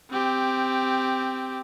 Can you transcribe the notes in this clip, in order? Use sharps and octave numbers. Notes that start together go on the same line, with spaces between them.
C4 G4